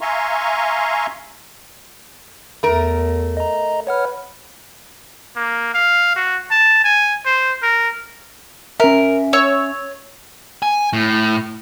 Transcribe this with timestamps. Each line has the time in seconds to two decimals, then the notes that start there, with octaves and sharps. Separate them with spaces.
0.01 E5 F5 G#5 A#5 C6 C#6
2.63 E2 A3 A#4
3.37 D#5 A#5
3.87 B4 C#5 F#5 F6
5.36 A#3
5.74 F5
6.16 F#4
6.51 A5
6.84 G#5
7.26 C5
7.63 A#4
8.80 C#4 A#4 E5
9.33 C#5 E6
10.62 G#5
10.93 A2